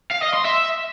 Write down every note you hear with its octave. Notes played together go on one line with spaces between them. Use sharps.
F5
D#5
C6
E5